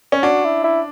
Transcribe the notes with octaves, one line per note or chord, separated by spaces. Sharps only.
C#4
D4 F#4
E4
E4